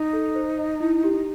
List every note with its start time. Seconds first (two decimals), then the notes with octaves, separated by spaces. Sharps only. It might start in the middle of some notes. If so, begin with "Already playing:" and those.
Already playing: D#4
0.13 A4
0.35 C5
0.58 D#5
0.80 E4
1.04 G4